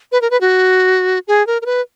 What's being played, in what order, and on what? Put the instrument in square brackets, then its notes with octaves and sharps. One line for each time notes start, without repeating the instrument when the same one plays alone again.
[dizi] B4
A#4
B4
F#4
G#4
A#4
A#4
B4